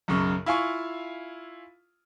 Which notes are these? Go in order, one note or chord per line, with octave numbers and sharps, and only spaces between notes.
B1 F#2 C#3 C#6
E4 F4 F5 G#5 C#6